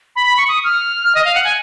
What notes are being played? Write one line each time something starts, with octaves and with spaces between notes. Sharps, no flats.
B5
B5
C#6
D#6
F6
D#5
F5
F#5
G#5